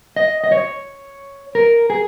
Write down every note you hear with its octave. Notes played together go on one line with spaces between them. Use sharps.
D#5
D#5
C#5
A#4
G#4